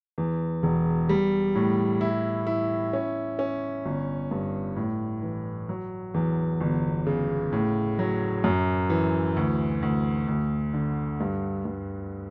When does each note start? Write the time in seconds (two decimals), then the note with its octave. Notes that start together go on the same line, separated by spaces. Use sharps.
0.18 E2
0.63 E1
1.09 G3
1.55 A2
2.01 E4
2.47 E4
2.93 C#4
3.39 C#4
3.86 G1
4.31 G2
4.76 A2
5.23 E3
5.69 F#3
6.14 E2
6.61 G1
7.07 C#3
7.53 A2
7.99 F#3
8.44 F#2
8.90 E3
9.36 D2
9.82 D2
10.28 D2
10.74 D3
11.20 G2
11.65 G2